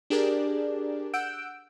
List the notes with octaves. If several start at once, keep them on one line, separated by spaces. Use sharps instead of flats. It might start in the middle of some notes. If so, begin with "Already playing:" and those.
D4 G4 G#4 A#4 D5
F#5 E6 F#6 G6 D7